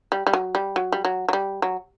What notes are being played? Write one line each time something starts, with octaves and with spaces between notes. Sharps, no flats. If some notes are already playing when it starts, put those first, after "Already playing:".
G3
G3
F#3
G3
F#3
G3
F#3
F#3
G3
F#3